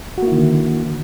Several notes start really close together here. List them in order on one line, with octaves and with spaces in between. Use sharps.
F#4 A#3 E4 D#3 D3